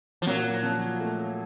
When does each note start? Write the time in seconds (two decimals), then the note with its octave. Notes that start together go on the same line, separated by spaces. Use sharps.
0.22 F3
0.26 A#2 F#3
0.63 F3
1.00 A3